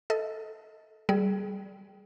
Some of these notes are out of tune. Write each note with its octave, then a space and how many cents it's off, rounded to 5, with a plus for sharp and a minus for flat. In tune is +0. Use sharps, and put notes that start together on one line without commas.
A4 +0 D#5 +25
G3 -10 G#4 +20